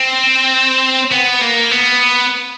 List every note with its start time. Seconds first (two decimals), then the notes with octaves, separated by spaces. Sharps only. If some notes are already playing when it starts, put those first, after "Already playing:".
Already playing: C4
1.12 B3
1.42 A#3
1.71 B3